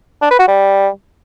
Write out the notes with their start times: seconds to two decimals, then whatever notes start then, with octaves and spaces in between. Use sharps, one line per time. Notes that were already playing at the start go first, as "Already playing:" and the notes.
0.22 D4
0.31 B4
0.39 F#4
0.48 G3